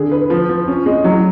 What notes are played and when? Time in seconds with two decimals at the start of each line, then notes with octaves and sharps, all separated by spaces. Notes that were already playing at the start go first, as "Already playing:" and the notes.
Already playing: D3 G#4
0.12 B4
0.30 F3
0.49 F3
0.67 C#4
0.86 G#3
1.04 F#3